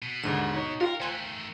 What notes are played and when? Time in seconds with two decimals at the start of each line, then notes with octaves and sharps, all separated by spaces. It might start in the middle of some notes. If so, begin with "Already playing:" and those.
0.02 B2
0.23 D#2 G#2 D3 D#7
0.55 D#4 C#5
0.81 F4 A#4 F5 G5
1.00 D#3 A3 C5 G#5 F#6